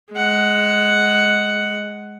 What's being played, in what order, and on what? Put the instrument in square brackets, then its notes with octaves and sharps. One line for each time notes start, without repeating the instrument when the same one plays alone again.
[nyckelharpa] G#3 F#5